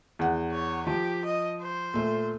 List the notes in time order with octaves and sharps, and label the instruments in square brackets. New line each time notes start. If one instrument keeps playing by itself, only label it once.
[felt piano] E2 F#5
[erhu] C#5
[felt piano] F3 [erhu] G4
[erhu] D#5
C5
[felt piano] A#2 A3